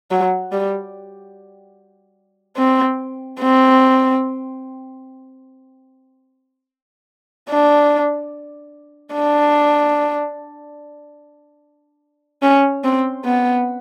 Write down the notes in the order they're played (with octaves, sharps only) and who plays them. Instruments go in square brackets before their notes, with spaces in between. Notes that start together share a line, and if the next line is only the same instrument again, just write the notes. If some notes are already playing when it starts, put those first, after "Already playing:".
[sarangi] F#3
G3
C4
C4
D4
D4
C#4
C4
B3